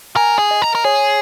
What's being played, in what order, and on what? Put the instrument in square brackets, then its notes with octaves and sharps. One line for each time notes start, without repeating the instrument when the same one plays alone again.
[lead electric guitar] A#4 [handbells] G#5
[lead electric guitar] G#4
[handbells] D#5
[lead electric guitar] A#4
A#4
[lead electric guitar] G#4 [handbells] C#5